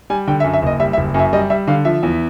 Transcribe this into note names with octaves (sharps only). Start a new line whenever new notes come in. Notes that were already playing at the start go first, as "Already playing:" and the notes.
G3 G#5
D3 G5
E5
F#2
E5
F#1 D#5
G3 E5
E5
F#1
F#2 E5
G3 D#5
G3 E5
D3 F5
F3 E5
E2